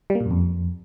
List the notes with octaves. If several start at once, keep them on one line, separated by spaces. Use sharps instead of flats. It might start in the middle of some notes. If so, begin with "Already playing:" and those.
G3
A#3
A#2
F#2
F2